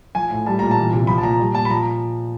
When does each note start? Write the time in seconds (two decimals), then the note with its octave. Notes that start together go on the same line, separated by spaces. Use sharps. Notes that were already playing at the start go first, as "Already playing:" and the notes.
0.15 F3 G#5
0.30 A2
0.46 G3 A5
0.59 A#2 A#5
0.71 A5
0.77 E3
0.93 C3
1.07 F3 B5
1.18 A5
1.23 A#2 A#5
1.39 G3
1.55 A#2 A5
1.65 B5
1.69 F3 A#5